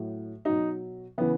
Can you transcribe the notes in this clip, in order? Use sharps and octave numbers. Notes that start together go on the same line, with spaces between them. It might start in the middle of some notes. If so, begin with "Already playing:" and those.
Already playing: A2 F#3
B2 F#3 D#4
C#3 E3 B3